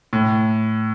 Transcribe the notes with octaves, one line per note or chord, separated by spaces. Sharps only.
A2